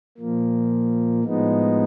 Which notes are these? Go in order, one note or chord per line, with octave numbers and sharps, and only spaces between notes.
A#2 F3 A#3
A2 F3 G#3 B3 D#4